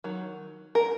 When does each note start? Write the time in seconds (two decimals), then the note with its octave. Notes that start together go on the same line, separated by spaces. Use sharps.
0.04 D#3 F#3
0.75 A#4